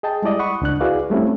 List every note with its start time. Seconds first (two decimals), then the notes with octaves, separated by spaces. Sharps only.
0.03 G#4 D#5 G5 A5
0.23 G3 G#3 E4 D5 D#5
0.39 F#5 B5 C#6 D#6
0.62 C#2 D4 F#6
0.80 E4 F#4 G#4 B4 D5 F5
1.10 G3 A3 C4 C#4 E4